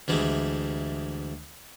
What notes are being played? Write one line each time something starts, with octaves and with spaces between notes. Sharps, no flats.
D2 E3 G3 G#3